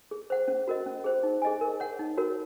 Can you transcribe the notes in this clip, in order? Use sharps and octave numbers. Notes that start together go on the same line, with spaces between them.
G#4
C5 F#5
C#4
F#4 A#4 D#5
C#4
G#4 C5
D#4
G#4 D#5 G#5
A#4
C#5 F#5
D#4
F#4 A#4 C#5